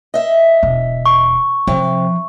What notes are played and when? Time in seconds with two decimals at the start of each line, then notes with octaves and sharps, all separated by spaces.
0.14 D#5 E5
0.63 E1
1.06 C#6
1.67 C3 F3